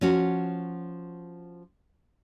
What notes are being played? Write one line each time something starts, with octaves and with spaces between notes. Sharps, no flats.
F3 C#4 F#4